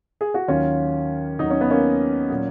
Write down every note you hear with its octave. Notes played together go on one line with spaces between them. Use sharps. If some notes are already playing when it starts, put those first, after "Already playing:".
G#4
F#4
D#2 D#3 F#3 C#4 F4
D#2 D#3 F#3 D#4
C#4
B3
A#3 C#4
A#2 F#3